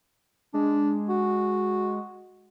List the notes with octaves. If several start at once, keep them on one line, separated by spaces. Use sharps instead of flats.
G#3 D4
F#4